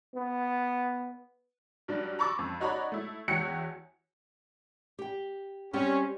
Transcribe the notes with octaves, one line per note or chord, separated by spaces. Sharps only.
B3
G2 F#3 G3 D4
A#5 B5 C#6 D6 E6 A6
F2
D#4 F#4 C#5 D5 A#5 B5
A3 E4
E2 E4 F#4 C#5 G5 C#7
G4 G5
G3 C4 C#4 G4